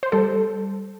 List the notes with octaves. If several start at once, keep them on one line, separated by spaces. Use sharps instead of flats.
C5
G3 A4